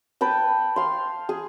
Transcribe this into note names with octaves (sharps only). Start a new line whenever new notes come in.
B4 G5 A5
F5 C6
G#4